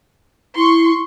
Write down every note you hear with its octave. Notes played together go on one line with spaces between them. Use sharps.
E4 C6 C#6